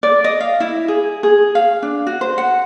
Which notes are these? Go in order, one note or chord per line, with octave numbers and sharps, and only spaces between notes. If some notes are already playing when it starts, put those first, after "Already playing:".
D5
D#5
F5
E4
G#4
G#4
F5
D4
F#4
C5
F#5